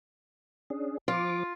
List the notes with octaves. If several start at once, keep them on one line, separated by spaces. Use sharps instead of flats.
C#4 D4 G#4
F3 F4 D6